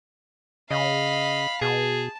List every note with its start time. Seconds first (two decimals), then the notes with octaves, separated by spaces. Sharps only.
0.71 C#3 D#5 F5 B5
1.61 B2 G#4 A5